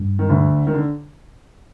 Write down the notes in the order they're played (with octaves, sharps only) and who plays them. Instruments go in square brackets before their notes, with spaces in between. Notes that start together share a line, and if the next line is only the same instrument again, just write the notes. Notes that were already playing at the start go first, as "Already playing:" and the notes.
Already playing: [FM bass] G2
[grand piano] D#3
D2 D3
D#3
D3